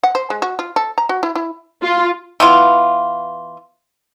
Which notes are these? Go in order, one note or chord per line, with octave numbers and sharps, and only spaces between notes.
F#5
C5
G#3
F#4
F4
A4
A#5
F#4
E4
E4
F4
E3 B3 F4